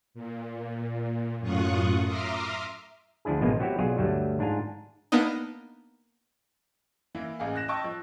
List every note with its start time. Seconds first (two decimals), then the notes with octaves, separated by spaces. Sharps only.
0.14 A#2
1.40 F#2 A2 F4 C#6 D#6 F#6
2.07 E5 A#5 C6 D6 D#6 F6
3.25 D2 F3 D4 E4 G#4
3.41 A1 B2 F3 G#3 A#3 F4
3.59 F#3 C4 E4 F#4 G4
3.79 B1 F#3 F4 G#4 C#5 D5
3.97 D2 G2 F#3 G3 A3
4.39 G#2 D4 F4 G#5 A#5
5.12 A#3 B3 D4 D#4 D#5
7.15 E3 A#3 E4
7.39 A1 G#4 F5
7.56 F#6 A#6 E7
7.68 D#5 G5 A5 C#6 E6
7.84 F3